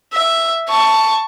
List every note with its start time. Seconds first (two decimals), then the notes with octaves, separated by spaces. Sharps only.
0.13 E5
0.68 A5 C#6